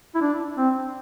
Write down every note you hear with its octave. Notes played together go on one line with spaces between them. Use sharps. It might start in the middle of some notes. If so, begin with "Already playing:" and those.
E4
D4
C4